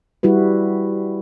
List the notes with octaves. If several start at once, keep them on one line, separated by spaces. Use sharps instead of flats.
G3 E4 F#4 B4